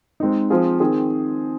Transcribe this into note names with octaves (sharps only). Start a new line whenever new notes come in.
G#3 C4 D#4
F3 C4 F4 G#4
D#3 C4 G#4